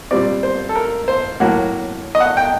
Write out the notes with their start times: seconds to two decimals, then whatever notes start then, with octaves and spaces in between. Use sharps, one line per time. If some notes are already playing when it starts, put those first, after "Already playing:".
0.11 A#2 G3 C4 D5
0.43 C5
0.69 A4
0.76 A#4
1.08 C5
1.40 A2 F#3 A#3 F#4
2.15 D#5
2.20 F#5
2.37 G5